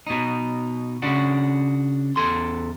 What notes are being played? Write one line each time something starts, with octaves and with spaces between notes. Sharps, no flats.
B2 D#4
C#3 D4 F#4
E2 A4 C6